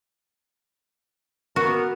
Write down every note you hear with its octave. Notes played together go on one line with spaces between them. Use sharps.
A#3 B3 F#4 A#4